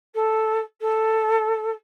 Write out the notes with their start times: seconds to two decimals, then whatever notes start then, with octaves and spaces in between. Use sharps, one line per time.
0.14 A4
0.81 A4